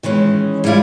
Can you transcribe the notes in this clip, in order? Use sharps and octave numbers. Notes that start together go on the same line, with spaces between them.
D#3 E3 G#3 C#4
G3 G#3 C#4 E4 F4